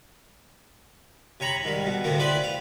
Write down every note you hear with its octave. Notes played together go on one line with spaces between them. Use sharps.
C3 C#5 A#5 B5
G#2 D#3 G3
B2
D2 A2 C3 A3 A#3
E4 G4 B4 C5 D5
F5